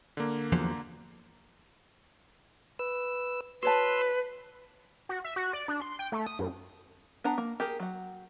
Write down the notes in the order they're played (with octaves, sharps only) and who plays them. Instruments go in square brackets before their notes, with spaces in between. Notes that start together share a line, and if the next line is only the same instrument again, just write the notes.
[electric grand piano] D3 A#3
[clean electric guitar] E2 F3 F#3
[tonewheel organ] B4 E6
[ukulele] F#4 C#5 A5 [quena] B4 [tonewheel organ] C6 E6
[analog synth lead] F#4
E5
F#4
D5
D4
C6
G5
A3
D#6
F#2
[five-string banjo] B3 D4 F#5 A#5
A#3
G4 G#4 A#4
F#3 F#5